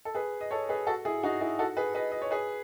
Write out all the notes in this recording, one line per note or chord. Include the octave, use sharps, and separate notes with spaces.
A4
G#4 B4
D#5
A4 C#5
G#4 B4
F#4 A4
E4 G#4
D#4 F#4
E4 G#4
F#4 A4
G#4 B4
B4 D#5
D#5
C#5
G#4 B4